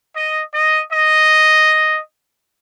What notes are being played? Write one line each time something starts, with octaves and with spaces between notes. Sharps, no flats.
D#5
D#5
D#5